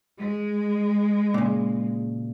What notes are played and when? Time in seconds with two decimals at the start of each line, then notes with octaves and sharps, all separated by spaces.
0.19 G#3
1.34 A#2 C#3